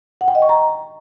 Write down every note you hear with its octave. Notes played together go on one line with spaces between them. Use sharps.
F#5
G5
D#5
C#6
A#5